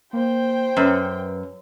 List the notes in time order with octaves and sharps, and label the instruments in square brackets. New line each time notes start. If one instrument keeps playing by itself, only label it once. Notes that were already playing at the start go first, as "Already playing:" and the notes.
[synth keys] A#3 [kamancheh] C5 G5
[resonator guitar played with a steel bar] F#2 [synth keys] B4 C#5